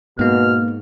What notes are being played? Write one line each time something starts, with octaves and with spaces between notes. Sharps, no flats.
G#2 B2 A#3 B3 F6